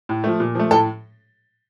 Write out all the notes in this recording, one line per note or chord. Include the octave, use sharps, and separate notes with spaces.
A2
F3 A3
A#2
F3 A3
A2 A4